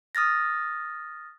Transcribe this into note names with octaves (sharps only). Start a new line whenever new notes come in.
D#6 F6 A6 A#6